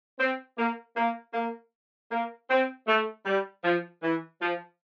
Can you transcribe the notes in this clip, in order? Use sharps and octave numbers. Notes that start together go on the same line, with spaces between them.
C4
A#3
A#3
A#3
A#3
C4
A3
G3
F3
E3
F3